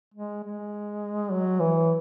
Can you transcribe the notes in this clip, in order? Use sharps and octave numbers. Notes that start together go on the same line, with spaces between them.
G#3
G#3
F#3
E3